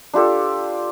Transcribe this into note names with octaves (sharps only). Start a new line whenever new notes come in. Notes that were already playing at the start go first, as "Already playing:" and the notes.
D4 F4 G4 A4